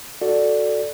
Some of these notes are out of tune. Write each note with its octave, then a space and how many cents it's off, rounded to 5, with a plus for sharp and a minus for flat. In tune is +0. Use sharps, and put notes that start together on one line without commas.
F#4 +0 A4 +0 D5 +0